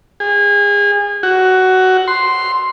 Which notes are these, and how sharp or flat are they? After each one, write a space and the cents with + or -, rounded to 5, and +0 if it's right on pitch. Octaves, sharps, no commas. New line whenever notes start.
G#4 -30
F#4 +15
C6 +0